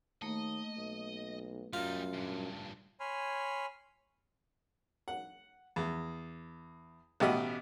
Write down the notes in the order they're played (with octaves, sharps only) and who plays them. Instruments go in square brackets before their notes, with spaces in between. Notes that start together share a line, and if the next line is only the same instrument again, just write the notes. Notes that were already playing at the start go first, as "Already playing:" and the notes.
[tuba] D#2 [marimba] A3 A#3 [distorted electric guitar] D#5
[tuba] B1
[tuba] F#2 [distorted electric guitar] G3 D#4 [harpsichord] F4
[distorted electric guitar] G2 A#2
[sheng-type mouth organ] C#5 G#5 B5 C6 F6
[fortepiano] F#5
E2
A1 B2 G4 D#5 F#5